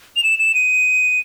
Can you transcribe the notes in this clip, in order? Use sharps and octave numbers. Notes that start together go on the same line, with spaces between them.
F7
E7
E7
D#7